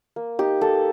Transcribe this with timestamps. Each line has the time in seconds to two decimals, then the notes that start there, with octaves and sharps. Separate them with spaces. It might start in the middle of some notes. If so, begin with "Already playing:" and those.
0.16 A#3
0.39 D#4 G4
0.61 A#3 A4